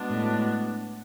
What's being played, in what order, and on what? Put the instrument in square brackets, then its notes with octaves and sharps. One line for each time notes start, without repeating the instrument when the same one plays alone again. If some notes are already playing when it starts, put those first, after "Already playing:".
Already playing: [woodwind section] B2 G#3 B3 D4
[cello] A2